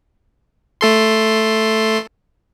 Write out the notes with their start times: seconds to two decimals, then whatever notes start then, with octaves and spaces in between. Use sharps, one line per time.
0.81 A3 A4 C6